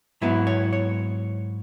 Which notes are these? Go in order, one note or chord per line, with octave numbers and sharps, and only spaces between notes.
G#2 F#3 B3 E4 B4
C#5
C#5